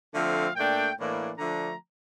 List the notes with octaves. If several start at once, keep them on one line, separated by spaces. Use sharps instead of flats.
D3 F3 A3 C4 F5
A#2 A3 D4 G5
A2 E3 A#3 D4
D3 F3 A3 D4 A#5